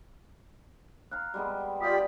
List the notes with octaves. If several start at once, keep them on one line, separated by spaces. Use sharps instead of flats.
F5 A#5 F6 F#6
G3 G#3 B3
F4 G4 D5 B5 D#6